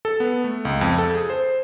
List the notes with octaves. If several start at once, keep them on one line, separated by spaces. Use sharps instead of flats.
A4
B3
A3
C#2
F2
A4
G#4
C5